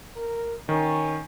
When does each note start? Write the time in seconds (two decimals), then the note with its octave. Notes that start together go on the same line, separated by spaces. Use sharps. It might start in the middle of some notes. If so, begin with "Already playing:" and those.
0.16 A#4
0.69 D#3 C#4